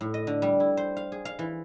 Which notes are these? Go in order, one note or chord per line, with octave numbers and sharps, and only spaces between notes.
A2
D#5
D3
G3
E4
C5
F5
G#4
F5
E3